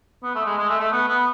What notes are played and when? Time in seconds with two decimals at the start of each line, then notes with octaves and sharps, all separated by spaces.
0.23 B3
0.35 A3
0.46 G#3
0.57 G#3
0.69 A3
0.80 A3
0.92 B3
1.08 B3